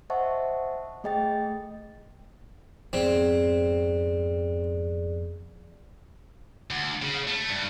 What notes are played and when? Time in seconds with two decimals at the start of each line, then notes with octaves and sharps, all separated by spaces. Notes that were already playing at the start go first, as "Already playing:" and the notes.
0.10 C5 D#5 E5 F#5 A5 C#6
1.04 A3 G#4 D#5 G5 A6
2.93 F2 G#2 B2 C4 G#4 D5
6.71 D2
7.02 C#3
7.27 A3
7.49 G2